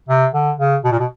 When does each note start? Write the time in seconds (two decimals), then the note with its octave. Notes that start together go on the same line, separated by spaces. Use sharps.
0.09 C3
0.34 D3
0.59 C#3
0.84 B2
0.92 A#2
1.00 B2